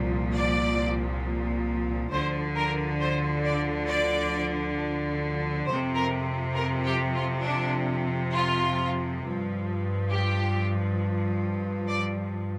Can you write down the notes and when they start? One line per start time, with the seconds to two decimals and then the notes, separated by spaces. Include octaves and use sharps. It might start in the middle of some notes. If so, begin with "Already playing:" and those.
Already playing: C2 A#2 F3
0.33 D5
2.10 D2 D3 F3 C5
2.56 A#4
3.00 C5
3.45 D5
3.88 D5
5.66 F2 C3 F3 C5
5.96 A#4
6.55 A#4
6.85 G4
7.14 F4
7.43 D4
8.33 F4
9.22 G2 F3
10.10 G4
11.87 D5